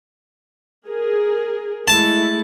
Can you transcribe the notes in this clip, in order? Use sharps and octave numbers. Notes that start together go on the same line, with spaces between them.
G#4 A#4
G#3 A3 E4 A5